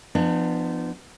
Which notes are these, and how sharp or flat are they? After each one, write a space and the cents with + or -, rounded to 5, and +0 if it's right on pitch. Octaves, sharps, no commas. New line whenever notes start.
F3 -20 B3 +10 D4 +40